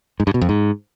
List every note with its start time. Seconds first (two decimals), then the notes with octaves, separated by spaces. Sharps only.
0.20 G#2
0.27 G2
0.34 B2
0.41 F2
0.49 G#2